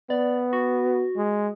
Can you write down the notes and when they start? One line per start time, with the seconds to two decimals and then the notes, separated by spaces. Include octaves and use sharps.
0.10 B3 D5
0.53 F#4
1.16 G#3